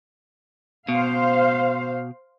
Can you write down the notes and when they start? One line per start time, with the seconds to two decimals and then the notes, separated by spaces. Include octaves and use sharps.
0.88 B2 C5 F5